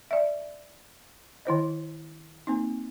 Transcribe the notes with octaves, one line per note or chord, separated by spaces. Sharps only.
D5 E5
D#3 E4 C5 D#5
A#3 C4 D#4